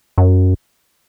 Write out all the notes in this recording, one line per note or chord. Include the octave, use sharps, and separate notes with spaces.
F#2